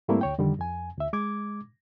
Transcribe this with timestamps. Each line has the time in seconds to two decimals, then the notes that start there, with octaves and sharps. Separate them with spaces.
0.08 G#2 G3 A3 A#3 C4 E4
0.21 D2 C#5 G5
0.38 F2 D3 D#3 G3
0.59 F2 G#5
0.98 D2 E5
1.13 G#3 D6 G#6